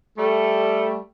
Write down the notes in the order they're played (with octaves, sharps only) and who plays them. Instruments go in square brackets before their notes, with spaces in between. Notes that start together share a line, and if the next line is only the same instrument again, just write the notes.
[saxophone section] G3 A3